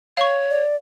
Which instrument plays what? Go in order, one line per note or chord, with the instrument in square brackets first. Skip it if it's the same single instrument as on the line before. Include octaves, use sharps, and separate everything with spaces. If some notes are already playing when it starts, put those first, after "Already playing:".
[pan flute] C#5 [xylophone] F5 C#6
[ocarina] D5